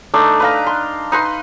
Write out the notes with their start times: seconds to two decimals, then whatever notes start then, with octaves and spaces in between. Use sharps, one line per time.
0.14 A3 D4 D#4
0.40 B4 F5 A#5
0.66 C6
1.12 D#4 B4 C6